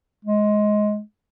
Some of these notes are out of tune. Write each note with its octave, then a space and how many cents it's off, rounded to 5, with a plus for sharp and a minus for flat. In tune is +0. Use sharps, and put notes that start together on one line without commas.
G#3 +15